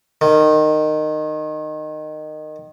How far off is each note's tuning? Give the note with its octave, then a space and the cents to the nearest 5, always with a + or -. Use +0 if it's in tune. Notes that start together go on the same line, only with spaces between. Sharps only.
D#3 -20